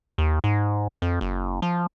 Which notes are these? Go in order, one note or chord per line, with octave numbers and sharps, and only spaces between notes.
D#2
G#2
F2
F#1
F3